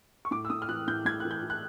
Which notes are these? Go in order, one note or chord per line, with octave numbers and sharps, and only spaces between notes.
C#6
A2 D6
E6
A2 D#6
F6
E3 F#6
A2 G6
A2 G#6
E3 F#6
G6
E3
F#6